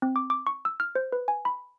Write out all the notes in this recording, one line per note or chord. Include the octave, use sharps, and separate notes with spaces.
C4
D6
D6
C#6
E6
F6
C5
B4
G#5
B5